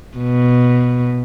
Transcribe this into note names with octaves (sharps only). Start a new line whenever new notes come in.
B2